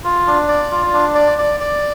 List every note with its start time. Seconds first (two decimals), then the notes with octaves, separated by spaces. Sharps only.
0.04 F4
0.27 D4
0.48 D5
0.71 F4
0.94 D4
1.15 D5
1.38 D5
1.60 D5